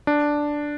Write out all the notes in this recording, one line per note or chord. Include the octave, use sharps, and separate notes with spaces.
D4